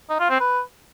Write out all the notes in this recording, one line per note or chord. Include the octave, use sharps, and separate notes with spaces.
D#4
F4
C4
B4